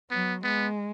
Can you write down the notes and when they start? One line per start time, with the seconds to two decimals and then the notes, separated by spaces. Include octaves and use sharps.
0.10 F#3 B3
0.44 G#3 B3